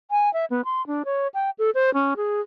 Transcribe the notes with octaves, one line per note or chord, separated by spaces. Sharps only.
G#5
E5
B3
C6
D4
C#5
G5
A4
C5
C#4
G#4